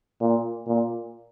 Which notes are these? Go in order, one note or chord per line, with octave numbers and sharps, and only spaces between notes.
A#2
A#2